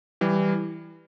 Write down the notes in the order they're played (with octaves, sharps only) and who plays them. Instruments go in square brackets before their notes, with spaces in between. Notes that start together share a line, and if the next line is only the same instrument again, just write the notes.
[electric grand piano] E3 G3